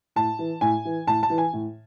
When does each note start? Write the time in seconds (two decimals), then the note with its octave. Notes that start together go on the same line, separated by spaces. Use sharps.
0.16 A2 A5
0.39 E3
0.61 A2 G#5
0.85 E3
1.07 A2 A5
1.23 A5
1.30 E3
1.38 G#5
1.53 A2